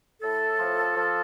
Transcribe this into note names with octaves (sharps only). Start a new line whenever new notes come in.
A2 A4
F3
F3